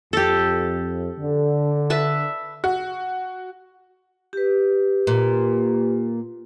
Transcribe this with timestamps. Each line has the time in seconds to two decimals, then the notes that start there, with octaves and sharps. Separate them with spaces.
0.13 F2 G4 A4
1.19 D3
1.90 B4 E5 A5
2.64 F#4
4.33 G4 B4
5.07 A#2